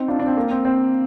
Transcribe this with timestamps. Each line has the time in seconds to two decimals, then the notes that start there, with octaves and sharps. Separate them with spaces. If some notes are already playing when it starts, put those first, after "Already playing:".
Already playing: C4 D#4
0.08 D4 F4
0.19 D4
0.26 C4
0.37 A#3
0.50 C4
0.65 C4